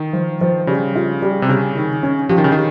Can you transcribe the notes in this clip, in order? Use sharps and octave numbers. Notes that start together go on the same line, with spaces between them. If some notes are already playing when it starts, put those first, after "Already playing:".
Already playing: D#3
F3
F3
C#3 G3
F4
G3
C3
C#3 C#4
D#3
C#4
F3 G4
D#3
C#3
D#3